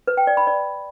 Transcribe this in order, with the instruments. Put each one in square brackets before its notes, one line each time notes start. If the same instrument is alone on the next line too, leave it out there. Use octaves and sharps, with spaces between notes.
[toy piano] B4
G5
D5
B5
D5